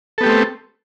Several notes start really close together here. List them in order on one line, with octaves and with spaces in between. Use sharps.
A4 B3 G4 A3 C4